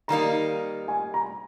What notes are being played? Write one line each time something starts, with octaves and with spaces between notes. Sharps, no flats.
D#3 G3 A#3 D#4 A#5
G#5
A#5